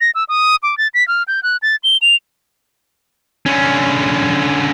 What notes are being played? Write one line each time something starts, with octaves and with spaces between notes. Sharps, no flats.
A#6
E6
D#6
D6
A6
B6
F6
G6
F#6
A6
G7
F7
D3 C#4